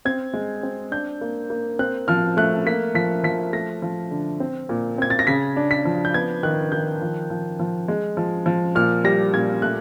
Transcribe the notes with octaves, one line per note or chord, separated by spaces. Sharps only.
C4 G#6
G#3
C4
D4 G6
A#3
A#3
C4 F#6
F3 F6
A3 F#6
A#3 B6
F3 B6
F3 B6
A3 A#6
F3
D3
C4
A#2
C4 G#6
A6
A#6
C#3 B6
D4
B6
F3
G6
B3 G#6
D#3 F#6
D#3 G6
F3
F3
F3
G#3
F3
F3
A#2 F6
G3 A#6
A#2 G#6
A3 F#6